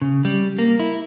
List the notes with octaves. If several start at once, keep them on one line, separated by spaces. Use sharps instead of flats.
C#3
G3
A#3
E4